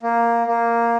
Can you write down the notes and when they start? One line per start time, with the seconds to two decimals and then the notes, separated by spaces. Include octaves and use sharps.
0.03 A#3
0.47 A#3